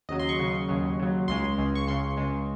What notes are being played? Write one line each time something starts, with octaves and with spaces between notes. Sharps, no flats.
D#2 C#3 F#3 D#5
C6
C#6
D#2 C#3 F#3
D#2 C#3 F#3
D#2 C#3 F#3
C#2 C#3 G#3 C6
C#2 C#3 G#3
C#6
C#2 C#3 G#3 C6
C#2 C#3 G#3